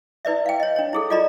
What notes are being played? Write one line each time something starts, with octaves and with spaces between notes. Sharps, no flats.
E4 B4 D5 E5
F5 G5
C#5 D#5
D4 C#5
E4 G#4 A4
F4 A4 D5 D#5 A#5 B5